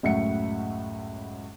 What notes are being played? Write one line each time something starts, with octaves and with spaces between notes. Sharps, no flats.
C#2 F#2 A2 E5 F#5 C#7